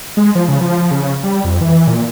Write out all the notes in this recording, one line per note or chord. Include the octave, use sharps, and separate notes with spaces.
G#3
F3
C#3
F3
C#3
G3
F2
E3
E3
A#2